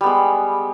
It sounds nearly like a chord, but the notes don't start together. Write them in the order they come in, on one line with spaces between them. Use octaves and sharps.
G3 B3 G#3